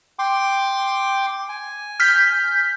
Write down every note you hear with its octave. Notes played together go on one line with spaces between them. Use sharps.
G5 C6 D6
G#5
F6 G6 B6